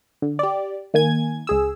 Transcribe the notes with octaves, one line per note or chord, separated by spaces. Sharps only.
D3
G4 D5
D#3 A#3 G#5 G#6
C#2 G#4 E6